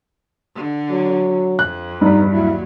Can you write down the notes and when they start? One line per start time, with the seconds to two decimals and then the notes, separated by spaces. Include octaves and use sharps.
0.55 D3
0.91 F#3
1.59 F2 F#6
2.01 G2 G3 D#4
2.32 D#2 F#3 E4